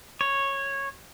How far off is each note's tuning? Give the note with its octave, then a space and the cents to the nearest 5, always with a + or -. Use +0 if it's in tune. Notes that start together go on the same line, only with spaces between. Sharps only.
C#5 -10